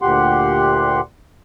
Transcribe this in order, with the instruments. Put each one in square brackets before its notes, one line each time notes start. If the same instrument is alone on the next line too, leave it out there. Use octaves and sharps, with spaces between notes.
[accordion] D2 A#2 G4 F#5 C6